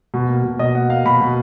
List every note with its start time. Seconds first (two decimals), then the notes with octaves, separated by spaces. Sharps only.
0.14 B2
0.29 A#3
0.44 B2
0.59 B2 D#5
0.75 A#3 F#5
0.90 A#3 F5
1.05 B2 B5
1.21 B2